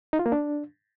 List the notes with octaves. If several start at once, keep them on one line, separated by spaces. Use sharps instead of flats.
D#4
F4
A#3
D4